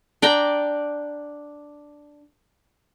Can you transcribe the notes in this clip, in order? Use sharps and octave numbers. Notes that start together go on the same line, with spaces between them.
D4 D5 G5 A#5